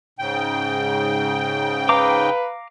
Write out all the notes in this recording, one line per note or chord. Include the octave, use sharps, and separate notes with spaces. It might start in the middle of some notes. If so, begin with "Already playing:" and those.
G#2 C#3 G5
B4 F5 A#5 D6